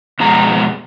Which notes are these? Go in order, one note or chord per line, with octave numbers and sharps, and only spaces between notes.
F2 B2 G#3 A#5